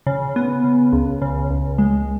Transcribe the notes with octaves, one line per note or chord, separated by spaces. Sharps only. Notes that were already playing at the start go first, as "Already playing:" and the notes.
C#3
B3
C#3
C#2
C#3
C#2
G#3